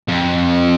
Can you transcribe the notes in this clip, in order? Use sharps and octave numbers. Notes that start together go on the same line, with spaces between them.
F2